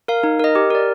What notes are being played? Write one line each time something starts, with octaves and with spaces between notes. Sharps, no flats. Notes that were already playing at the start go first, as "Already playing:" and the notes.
A#4 F5
D#4
A#4 D#5
G4
A#4 D5